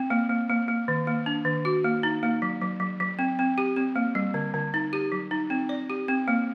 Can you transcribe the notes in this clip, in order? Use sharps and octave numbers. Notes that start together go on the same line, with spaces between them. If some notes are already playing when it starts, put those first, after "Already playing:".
Already playing: C4
A#3
A#3
A#3
A#3
D#3
A#3
D4
D#3
F#4
A#3
D#4
A#3
F#3
F#3
F#3
F#3
C4
C4
G4
C4
A#3
G3
D3
D3
D#4
G4
F#3
D#4
C4
D5
G4
C4
A#3